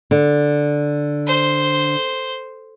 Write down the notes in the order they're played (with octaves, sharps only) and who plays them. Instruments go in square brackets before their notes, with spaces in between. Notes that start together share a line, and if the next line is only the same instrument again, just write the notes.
[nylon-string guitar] D3
[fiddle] C5